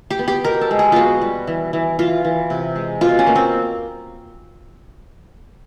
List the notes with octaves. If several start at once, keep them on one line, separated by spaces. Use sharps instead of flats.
G4
B3
G4
B2 A#4
A4
G#3
G#4
B3 F4 F#4
G3
E3
E3
E3 F4
E3
C3
G#3
B2 F4
C#4
A#3
C4